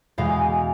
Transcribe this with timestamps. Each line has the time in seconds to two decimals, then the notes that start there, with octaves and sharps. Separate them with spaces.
0.18 E2 B2 G#3 F5